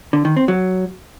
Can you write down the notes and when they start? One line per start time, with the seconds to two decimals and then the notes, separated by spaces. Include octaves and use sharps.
0.13 D3
0.25 D#3
0.37 C4
0.48 F#3